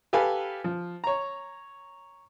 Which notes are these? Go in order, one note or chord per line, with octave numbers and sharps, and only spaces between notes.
G4 A4 B4 F5 G#5
F3
C#5 A#5